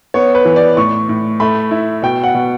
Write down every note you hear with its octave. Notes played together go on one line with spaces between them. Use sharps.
B3 C#5
B4
E3
D5
A2 C#6
A2
A3 B5
E4
B2 G5
F#5
B2